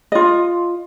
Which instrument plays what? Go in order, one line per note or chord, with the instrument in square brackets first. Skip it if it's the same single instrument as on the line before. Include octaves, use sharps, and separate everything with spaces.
[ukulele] F4 D#5